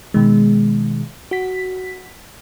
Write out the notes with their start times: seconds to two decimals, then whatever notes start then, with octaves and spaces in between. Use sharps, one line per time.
0.14 B2 D#3 G#3
1.31 F#4 B6